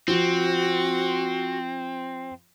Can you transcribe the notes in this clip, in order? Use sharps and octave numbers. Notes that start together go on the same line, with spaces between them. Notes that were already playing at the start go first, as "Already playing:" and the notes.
F3 C4 F#4